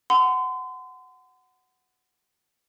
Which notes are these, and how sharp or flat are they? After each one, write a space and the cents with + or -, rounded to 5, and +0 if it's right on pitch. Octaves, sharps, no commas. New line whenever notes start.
F#5 +5 C6 -35